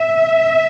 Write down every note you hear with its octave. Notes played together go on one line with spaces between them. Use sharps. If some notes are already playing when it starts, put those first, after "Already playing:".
Already playing: E5